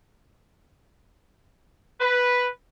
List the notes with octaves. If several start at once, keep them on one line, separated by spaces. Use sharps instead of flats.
B4